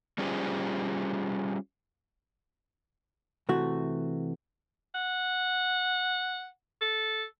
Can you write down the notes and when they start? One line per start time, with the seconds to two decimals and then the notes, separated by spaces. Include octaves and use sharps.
0.18 G3 C#4 F4 G4 G#4 C5
3.49 C3 E3 A3 F#4
4.95 F#5
6.81 A4